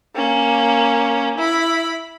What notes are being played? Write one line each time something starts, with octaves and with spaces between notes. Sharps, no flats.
A#3 C#4
E4 B5